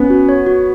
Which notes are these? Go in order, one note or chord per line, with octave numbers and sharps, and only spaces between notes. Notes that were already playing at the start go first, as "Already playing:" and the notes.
Already playing: B3 C#4
F#4
C#5
F#4